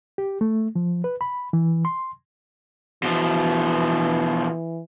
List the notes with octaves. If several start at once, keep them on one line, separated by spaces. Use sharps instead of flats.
G4
A3
F3
B4
B5
E3
C6
B2 E3 F3